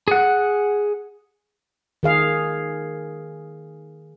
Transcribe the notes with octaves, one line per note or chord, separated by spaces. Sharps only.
G#4 F#5
D#3 G#4 F5